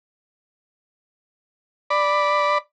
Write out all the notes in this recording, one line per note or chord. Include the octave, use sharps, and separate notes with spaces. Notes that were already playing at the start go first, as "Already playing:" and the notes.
D5 B5